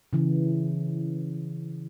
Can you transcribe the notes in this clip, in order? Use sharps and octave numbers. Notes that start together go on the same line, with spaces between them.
C#3 E3